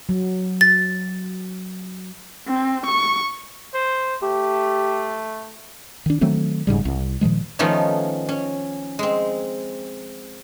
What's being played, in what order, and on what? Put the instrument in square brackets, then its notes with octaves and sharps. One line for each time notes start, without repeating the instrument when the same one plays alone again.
[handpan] F#3
[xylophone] A6
[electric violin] C4
C#6
[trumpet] C5
[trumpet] A3 [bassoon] G4
[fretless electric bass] D#3 D4
D#3 F#3 A3 C4
F1 G#2 C#3 G3
C2
A#2 D#3 F3 G#3
[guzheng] D#3 F3 A3 B3 C#4 D#4
C#4
G#3 C4